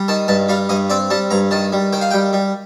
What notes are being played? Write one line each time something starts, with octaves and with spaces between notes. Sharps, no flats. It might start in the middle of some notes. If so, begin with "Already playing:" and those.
Already playing: G3
D#3 A5
G2 A5
G3 F5
G2 D#5
C4 D5
G3 A5
G2 A#5
D#3 A5
G3
D#3 G5
F5
G5
G3
G3